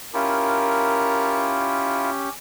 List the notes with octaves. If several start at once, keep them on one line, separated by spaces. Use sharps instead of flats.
C#4 E4 F4 G4 A#4